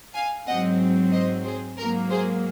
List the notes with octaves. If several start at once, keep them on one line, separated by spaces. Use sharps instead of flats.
F5 G#5
G#2 F#3 C4 D#5 F#5
C5 D#5
G#4 C5
G#2 F#3 A#3 A#4
G#4 C5